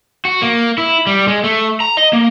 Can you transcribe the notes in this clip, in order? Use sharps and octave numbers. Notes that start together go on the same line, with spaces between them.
F#4
A#3
E4
G3
G#3
A3
A#5
D#5
A#3